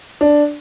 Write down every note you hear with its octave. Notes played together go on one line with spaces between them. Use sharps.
D4